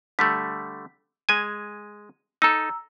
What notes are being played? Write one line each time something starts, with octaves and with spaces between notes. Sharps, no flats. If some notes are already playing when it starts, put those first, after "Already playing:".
D3 G3 A3 B6
G#3 G#5 D#7
D#4 A4 A#5 E6